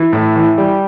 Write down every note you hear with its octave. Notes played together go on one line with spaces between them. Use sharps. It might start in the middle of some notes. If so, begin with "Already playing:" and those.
Already playing: E3
A2
E3
G3